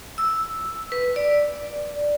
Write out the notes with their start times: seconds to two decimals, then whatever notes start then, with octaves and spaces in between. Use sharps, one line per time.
0.18 E6
0.92 B4
1.16 D5